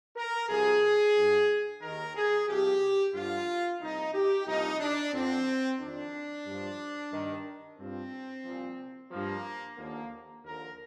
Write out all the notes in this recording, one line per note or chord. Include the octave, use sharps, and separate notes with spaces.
A#4
C2 C3 F3 G#4
G2 D3 F3
D#2 D#3 A#4
G#4
C2 C3 F3 G4
G2 D3 F3 F4
C2 A#2 F3 D#4
G4
C2 A#2 F3 D#4
D4
F2 D3 F3 C4
F2 D#3 D4
G2 F3
G2 D#3
G2 F3 C4
C2 A#2 F3
G2 F3 A#3
D#2 D3 F3 A#3
D#2 D3 F3 A#4